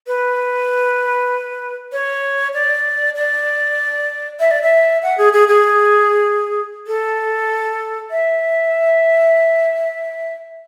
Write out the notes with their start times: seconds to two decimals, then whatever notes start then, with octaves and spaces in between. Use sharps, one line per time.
0.07 B4
1.92 C#5
2.54 D5
3.16 D5
4.39 E5
4.51 D5
4.62 E5
5.02 F#5
5.18 G#4
5.33 G#4
5.48 G#4
6.87 A4
8.11 E5